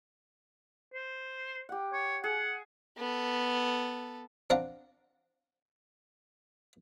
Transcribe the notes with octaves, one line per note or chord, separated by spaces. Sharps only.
C5
G4 F#5
C#5
G#4 F#5
B3 A4
C4 D4 F5 F#5 A#5